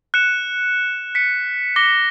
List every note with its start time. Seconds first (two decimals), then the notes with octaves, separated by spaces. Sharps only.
0.14 F#6 C#7 E7
1.15 B6 C#7
1.76 D6 A#6 B6 G7